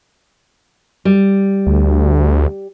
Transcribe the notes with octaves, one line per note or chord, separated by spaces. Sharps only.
G3
D2